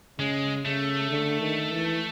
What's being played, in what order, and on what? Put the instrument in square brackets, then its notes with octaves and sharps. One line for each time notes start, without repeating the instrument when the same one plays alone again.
[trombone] C#3 [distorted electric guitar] G#3
[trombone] C#3 [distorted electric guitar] A3
[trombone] D3
D#3
E3